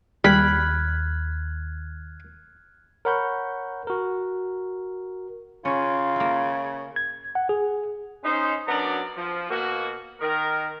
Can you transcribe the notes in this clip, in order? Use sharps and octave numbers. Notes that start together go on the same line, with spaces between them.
D#2 G3 B5 F6 F#6 G#6
A#4 C#5 F#5 B5 C#6 G6
F#4 A#4
C#3 C#4 F4 C#5
A#3 E4
G#6
F#5
G#4
C#4 D#4 C5
F#2 F#3 B3 D4 D5 A#5
F3
B2 A#3 F#4
D#3 A#4